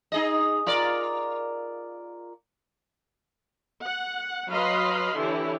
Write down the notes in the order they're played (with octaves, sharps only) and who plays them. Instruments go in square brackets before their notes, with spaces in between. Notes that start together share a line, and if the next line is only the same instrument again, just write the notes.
[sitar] D#4 G#4 D#5
F4 A#4 D5
[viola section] F#5
F#3 B4 D#5 F5 B5 C6
D3 E3 E4 G4 C#5